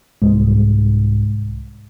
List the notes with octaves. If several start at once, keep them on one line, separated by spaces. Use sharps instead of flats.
C2 G#2